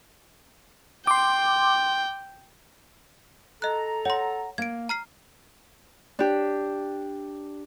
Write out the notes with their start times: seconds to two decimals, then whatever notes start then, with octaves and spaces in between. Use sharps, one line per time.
1.07 G5 C6 D6
3.62 A4 D#5 A#5 F#6
4.05 C#5 F#5 C6
4.58 A#3 G#6 D7
4.89 A#5 F6 C7
6.19 D4 G4